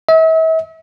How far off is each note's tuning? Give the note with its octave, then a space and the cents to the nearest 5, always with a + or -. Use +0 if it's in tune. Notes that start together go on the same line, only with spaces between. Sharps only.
E5 -40